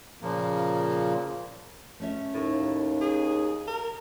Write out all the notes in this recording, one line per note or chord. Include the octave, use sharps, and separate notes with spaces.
A#2 C#3 F3 A#3
A3 C#4 E5
D#2 A2
G#4
A#4